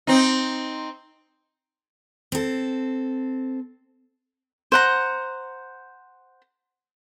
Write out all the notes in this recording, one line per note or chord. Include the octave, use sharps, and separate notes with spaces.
C4 D#4
C4 A4
C5 F#5 A#5